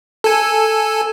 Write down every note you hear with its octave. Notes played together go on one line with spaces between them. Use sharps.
A4 G#5